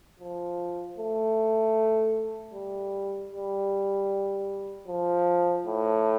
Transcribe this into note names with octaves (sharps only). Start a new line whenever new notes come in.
F3
A3
G3
G3
F3
A2